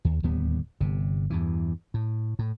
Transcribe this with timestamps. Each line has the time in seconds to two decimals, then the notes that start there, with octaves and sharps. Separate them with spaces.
0.05 D#2
0.23 D1 D#2 G3 B3
0.80 G1 C3
1.30 E2 G2 E3
1.94 A2
2.39 A2